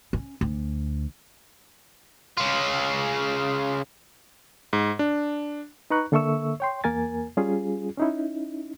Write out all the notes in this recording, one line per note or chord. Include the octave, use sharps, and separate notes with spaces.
C#4
D2
C#3 F4
G#2
D4
D#4 B4 A#5 C#6 F#6
D3 A#3 A4 E5 C#6 E6
C#5 G5 C6
E2 A#3 A#4 G#5 A6
G3 C#4 F4 G#4
C#4 D#4 E4